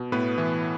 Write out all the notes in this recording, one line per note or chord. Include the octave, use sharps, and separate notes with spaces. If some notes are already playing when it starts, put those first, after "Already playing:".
Already playing: B2
A2 B3 B4
E3